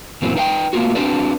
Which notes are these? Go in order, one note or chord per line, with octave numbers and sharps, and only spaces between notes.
F#2 A#2 E3 F#3 B3 C4
D#4 B4 F5 G5
A3 A#3 F4 F#4
C4 D4 F#4 B4 D5